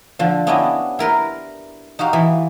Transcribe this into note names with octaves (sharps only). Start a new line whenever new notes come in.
D3 F3
B3 C#4 D4 E4 G4 D#5
E4 A#4 B4 C6
D#4 F#4 G4 F5
E3